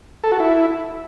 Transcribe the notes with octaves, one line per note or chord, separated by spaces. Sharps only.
A4
F#4
E4